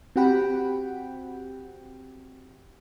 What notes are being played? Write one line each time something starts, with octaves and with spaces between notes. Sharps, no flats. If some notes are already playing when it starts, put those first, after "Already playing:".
C4 F#4 G4 F#5 G5 B5